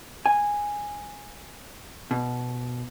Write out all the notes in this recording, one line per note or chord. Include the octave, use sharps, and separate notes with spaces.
G#5
B2